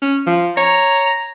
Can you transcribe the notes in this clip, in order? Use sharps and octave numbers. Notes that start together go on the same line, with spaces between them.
C#4
F3
C#5 A#5